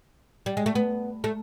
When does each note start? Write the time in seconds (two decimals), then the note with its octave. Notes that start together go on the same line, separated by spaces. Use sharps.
0.46 G3
0.57 G#3
0.66 A3
0.75 B3
1.24 A3